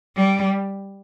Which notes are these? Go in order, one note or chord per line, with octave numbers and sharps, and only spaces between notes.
G3